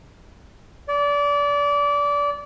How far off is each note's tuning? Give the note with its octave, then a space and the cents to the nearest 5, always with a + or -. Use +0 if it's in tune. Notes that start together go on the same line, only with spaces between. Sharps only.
D5 -25